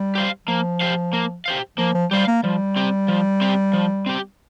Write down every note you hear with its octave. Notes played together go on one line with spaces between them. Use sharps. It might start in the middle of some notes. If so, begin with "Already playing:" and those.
Already playing: G3
G4 C5 F5
F3 A#3
G4 C5 F5
A#3
G4 C5 F5
F3 A#3
F3
G3 G4 C5 F5
A#3
F3 G3
C4 G4
F3
C4 G4
F3
C4 G4